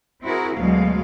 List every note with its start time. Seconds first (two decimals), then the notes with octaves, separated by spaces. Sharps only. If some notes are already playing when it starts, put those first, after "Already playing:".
0.23 C4 E4 F#4 G#4 A#4
0.56 D2 B2 F#3 G#3 F5